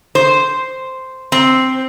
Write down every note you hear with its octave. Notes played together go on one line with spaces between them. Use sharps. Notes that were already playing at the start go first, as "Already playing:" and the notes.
C5
C4